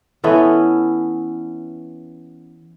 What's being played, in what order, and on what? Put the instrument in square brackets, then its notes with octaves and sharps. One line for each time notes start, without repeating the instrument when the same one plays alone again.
[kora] E3 B3 C#4 A4